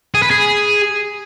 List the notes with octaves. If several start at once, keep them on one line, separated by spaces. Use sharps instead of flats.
G#4
B4
G#4